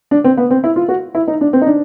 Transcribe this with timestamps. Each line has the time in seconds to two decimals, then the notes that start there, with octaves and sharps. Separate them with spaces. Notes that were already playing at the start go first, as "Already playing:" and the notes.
0.11 D4
0.24 C4
0.37 B3
0.51 C4
0.64 E4
0.76 F4
0.89 F#4
1.15 E4
1.28 D#4
1.41 D4
1.53 C4
1.62 D#4
1.66 D4